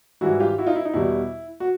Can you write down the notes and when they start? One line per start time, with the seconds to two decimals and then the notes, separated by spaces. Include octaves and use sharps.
0.21 G#2 E3 G3 E4 F#4
0.40 F4 G4
0.58 E4 F#4
0.66 D#4 F4
0.76 E4
0.85 D#4
0.94 E2 B2 G3 E4
1.60 F#4